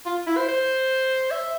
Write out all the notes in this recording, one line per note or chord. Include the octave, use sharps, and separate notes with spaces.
F4
E4
C5
C5
E5